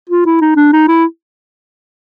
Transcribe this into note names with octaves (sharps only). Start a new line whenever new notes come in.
F4
E4
D#4
D4
D#4
E4